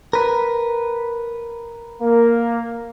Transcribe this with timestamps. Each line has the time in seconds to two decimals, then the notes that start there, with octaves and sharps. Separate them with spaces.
0.13 A#4 B4
2.01 A#3